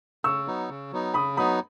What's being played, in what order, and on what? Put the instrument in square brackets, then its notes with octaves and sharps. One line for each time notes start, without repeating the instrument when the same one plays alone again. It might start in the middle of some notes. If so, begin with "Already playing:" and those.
[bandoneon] C#3 [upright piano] C#6 E6
[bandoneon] F#3 B3 D#4
C#3
F#3 B3 D#4
[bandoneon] C#3 [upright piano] B5 D#6
[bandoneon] F#3 B3 D#4 [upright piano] B5 D#6